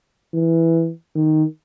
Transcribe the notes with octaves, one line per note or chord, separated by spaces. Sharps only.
E3
D#3